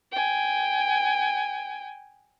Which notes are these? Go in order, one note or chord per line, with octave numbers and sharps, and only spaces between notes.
G5 G#5